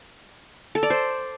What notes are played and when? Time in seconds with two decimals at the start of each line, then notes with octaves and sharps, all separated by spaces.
0.75 A4
0.83 D5
0.90 C5